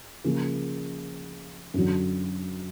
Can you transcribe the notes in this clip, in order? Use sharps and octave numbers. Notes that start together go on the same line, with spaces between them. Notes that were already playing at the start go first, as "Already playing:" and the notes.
C#3 F3 A#3
F#2 D3 F#3